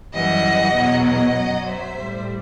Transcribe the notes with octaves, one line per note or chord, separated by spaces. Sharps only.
F#2 E3 G3 D#5 F#5
E2 B2 F#3
D#5 F#5
F#2 F#3
C5 E5
A2 G3